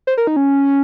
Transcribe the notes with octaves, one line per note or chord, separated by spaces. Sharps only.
C5
A#4
D#4
C#4